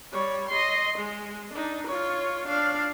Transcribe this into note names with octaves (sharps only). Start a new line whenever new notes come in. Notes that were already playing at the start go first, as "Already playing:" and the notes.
G3 C#5
D#5 C6
G#3
D4 D#4
F4 C#5
D4 F5